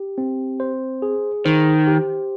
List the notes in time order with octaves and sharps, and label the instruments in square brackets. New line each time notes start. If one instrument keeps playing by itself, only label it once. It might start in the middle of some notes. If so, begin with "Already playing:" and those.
Already playing: [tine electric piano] G4
C4
C5
G#4
[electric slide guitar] D#3 [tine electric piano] C5
[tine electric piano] G4